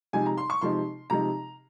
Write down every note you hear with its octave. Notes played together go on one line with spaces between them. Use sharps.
C3 F3 G#3 D#4 G#5
A#5
C6
C#6
C3 F3 G#3 D#4 C6
C3 F3 G#3 D#4 A#5